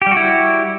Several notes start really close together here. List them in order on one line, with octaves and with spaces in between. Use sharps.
G4 G3 F#4 E4